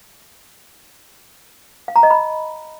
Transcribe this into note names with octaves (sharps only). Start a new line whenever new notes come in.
F5
A#5
D#5
B5